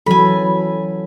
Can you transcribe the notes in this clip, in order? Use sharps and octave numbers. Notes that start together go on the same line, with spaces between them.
E3 F#3 A4 G#5 B5